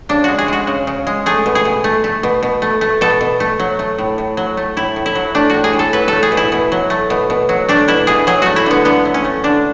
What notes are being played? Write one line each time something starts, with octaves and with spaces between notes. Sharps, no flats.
C#3 D4
G#3 F#4
G#4
G#3 F#4
C#3
C#3
G#3
A3 G#4
B2
G#4
B2
A3
A3
B2
B2
A3
A3
B2 A4
B2
A3
F#3
A3
A2
A2
F#3
A3
A2 E4
A2
E4
F#3
A3 D4
A2 F#4
G#4
A2
A4
F#3 B4
A3 A4
G#4
B2
E4
B2
F#3
A3
B2
B2
F#3
A3 D4
B2 E4
B2 G#4
F#3 G#4
A3 F#4
E4
D3 B3
D3 B3
F#3
C#4
A3
D3 D4